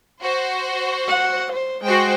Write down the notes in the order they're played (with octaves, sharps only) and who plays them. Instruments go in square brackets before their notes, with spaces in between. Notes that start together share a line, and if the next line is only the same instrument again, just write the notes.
[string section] F#4 C5
[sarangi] F#5
C5
[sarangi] G#3 [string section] F#4 C5 G5